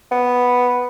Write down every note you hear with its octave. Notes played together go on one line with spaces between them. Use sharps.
B3